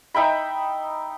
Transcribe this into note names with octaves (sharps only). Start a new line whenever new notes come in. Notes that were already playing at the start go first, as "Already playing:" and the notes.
D#4 E5 G5 B5